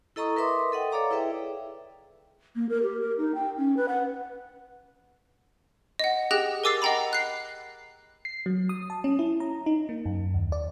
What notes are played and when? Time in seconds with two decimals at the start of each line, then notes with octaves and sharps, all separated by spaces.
0.16 E4 A4 D#5 A#5 C#6 D#6
0.36 A#4 B4 E5 C6 D6 D#6
0.72 A4 D#5 F#5 G5
0.92 A4 C#5 D5 F5 A#5 D6
1.10 E4 G#4 B4 E5 G5
2.56 A#3
2.69 A#4
2.83 G4
3.01 A#4
3.18 D#4
3.35 G5
3.57 C#4
3.77 B4
3.88 F#5
5.99 D#5 F#5
6.31 G4 G#4 G5 F#6 A#6
6.64 A#4 G#5 D6 E6 A6 C7
6.82 D#5 F#5 G5 A#5 B5
7.13 F#6 C7
8.25 C7
8.46 F#3
8.69 D#6
8.90 A5
9.04 C#4
9.19 E4
9.40 A#5
9.66 D#4
9.89 A#3
10.06 F#2
10.34 D#2
10.52 D5